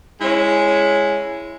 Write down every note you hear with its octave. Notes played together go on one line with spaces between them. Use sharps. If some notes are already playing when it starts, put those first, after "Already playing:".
G#3 C#4 E4